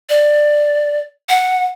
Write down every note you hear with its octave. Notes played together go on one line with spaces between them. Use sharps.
D5
F#5